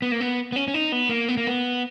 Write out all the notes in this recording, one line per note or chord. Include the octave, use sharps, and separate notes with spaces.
B3
A#3
B3
B3
C#4
C#4
D#4
B3
A#3
B3
A#3
B3